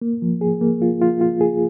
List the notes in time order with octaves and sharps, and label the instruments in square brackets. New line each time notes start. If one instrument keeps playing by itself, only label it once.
[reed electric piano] A#3
F3
G#4
A#3
F4
F4
F4
G#4